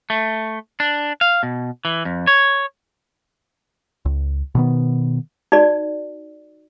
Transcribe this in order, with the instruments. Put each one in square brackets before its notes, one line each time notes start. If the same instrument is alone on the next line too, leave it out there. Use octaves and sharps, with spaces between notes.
[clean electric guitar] A3
D4
F5
B2
E3
F2
C#5
[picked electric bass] C#2
B2 D#3 B3
[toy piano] D#4 F#4 D5